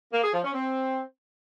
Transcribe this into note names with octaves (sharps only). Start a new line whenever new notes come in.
A#3
G#4
F3
C#4
C4